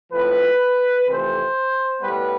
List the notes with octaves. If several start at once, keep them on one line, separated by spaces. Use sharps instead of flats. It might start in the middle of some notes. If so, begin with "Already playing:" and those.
A2 F3 C4 B4
F2 C3 E3 A3 C5
A2 G3 B3 B4